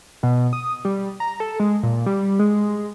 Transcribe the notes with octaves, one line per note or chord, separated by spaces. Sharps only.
B2
D#6
G3
A#5
A4
G#3
A#2
G3
G#3